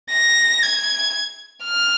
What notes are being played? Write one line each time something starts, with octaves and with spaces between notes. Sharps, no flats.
A#6
G#6
F6